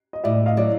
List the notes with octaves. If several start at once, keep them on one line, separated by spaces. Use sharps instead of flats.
D#5
A2 D5 E5
D#5 F5
F#3 D5